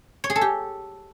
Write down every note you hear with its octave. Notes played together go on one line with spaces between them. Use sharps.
C#5
G#4
A4
G4